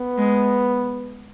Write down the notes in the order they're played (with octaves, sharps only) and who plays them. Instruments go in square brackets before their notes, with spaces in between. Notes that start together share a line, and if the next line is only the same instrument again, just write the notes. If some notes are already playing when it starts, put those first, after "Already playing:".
Already playing: [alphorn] B3
[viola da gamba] G#3